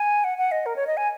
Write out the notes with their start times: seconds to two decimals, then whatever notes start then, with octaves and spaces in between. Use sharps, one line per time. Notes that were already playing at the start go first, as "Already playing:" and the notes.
Already playing: G#5
0.24 F#5
0.38 F#5
0.52 D#5
0.66 A#4
0.76 C#5
0.87 D#5
0.97 G#5